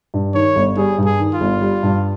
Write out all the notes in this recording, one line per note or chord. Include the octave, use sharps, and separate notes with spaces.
G2
D#3 C#5
G1
G3 G#4
G2
G#4
D#3
F4
G1
G3
G2